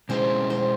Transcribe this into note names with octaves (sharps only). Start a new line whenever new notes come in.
B2 G#3 C#4 E4 G#4 C5
C5